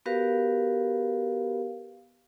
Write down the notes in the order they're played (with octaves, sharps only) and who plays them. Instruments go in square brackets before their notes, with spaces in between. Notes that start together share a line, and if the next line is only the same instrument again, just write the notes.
[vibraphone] B3 F#4 G4 A#4 B4 F5